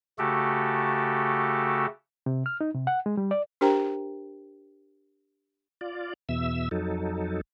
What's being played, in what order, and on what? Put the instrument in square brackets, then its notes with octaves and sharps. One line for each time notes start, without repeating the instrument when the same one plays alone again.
[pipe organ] C#3 A3 F#4 G4 A4
[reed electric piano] C3
F6
D#4
C3
F#5
G#3
G3
D5
[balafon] D4 G4 A#4 C5 G5 A#5
[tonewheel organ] F4 D5
E2 B2 E5 E6
F2 F#3 D#4 A4